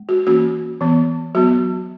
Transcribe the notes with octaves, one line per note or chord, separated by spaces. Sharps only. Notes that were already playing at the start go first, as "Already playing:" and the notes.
Already playing: G#3
F#4
E3 A#3 C#4 F#4
E3 B3
F#3 B3 F#4